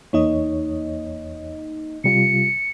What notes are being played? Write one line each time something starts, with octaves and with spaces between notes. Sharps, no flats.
E2 A#3 D#4 C#5 D#5
C3 G3 F4 C#7